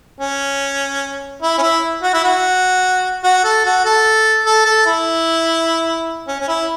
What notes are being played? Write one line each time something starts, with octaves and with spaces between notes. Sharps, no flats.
C#4
E4
C#4
E4
F#4
E4
F#4
F#4
A4
F#4
A4
A4
A4
E4
C#4
C#4
E4